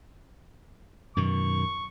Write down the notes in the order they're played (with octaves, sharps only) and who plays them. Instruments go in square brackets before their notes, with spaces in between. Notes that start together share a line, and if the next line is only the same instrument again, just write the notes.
[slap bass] F#2 B2 D#3 [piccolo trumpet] C#6